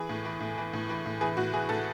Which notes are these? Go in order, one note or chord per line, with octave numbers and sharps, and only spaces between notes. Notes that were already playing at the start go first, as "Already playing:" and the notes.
Already playing: E3 G#4
A2
E3
A2
E3
A2
E3
A2
E3 G#4
A2 F#4
E3 G#4
A2 A4